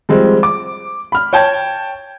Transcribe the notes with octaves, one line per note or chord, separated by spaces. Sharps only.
F3 G3 G#3 C4
D6
B5 F6
C#5 G5 A5 G6 G#6